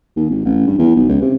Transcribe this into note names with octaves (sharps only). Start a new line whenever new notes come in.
D#2
G#1
A1
G2
E2
B1
C#2
C3